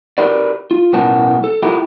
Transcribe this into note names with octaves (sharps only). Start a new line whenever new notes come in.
G4 A#4 B4 D5
F4
B1 A2 B3 C#4 A#4 A5
A4
E4 F4 G4 A4 A#4